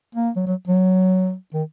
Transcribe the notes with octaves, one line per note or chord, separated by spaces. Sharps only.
A#3
F#3
F#3
F#3
D#3